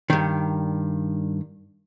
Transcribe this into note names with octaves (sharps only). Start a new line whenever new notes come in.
G2 D#3